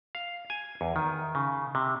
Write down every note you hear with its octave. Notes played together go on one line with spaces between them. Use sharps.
F5
G#5
E2
D#3
C#3
C3